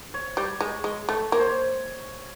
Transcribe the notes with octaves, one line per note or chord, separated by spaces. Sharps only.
C#5
G3
G#3
G#3
A3
A#3 C#5
C5
C#5